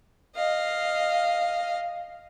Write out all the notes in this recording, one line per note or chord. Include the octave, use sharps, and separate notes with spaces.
D#5 F5